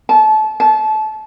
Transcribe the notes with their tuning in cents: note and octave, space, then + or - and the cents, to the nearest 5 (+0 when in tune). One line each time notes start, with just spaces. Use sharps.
A5 -30
A5 -25